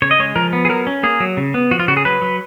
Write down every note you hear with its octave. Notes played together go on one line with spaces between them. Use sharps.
C#3 C#5
D#5
G#3 C#5
F3 A#4
B3
G#4
F#3 A#4
C#4
A#3 G#4
F#3
C#3
B3
F3 F#4
F4
C#3 F#4
G#4
F#3 B4
F#3